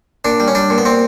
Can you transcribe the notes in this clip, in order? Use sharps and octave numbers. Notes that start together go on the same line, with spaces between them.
A#2 D4
G3
C#4
G3 D4
A#2
B3
A#2 C4